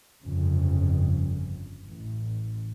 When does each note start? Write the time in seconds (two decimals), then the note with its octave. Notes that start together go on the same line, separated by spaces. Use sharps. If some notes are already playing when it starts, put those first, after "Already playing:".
0.23 G1 F2 C#3
1.84 A1